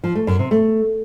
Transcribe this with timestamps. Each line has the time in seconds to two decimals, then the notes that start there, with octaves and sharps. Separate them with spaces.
0.04 F3
0.15 A3
0.27 F#2
0.39 C3
0.51 A3